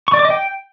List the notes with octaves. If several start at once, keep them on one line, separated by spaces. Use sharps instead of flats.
C#6
D5
D6
D#5
G5